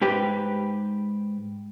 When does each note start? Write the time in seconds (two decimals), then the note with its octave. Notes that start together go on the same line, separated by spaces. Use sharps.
0.02 G#2 G4 B4